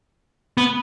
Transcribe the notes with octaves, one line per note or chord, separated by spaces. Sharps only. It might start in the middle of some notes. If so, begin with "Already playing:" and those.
B3